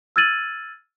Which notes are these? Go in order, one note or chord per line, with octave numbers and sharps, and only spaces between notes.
E6 F6 G#6 A6 D#7 F#7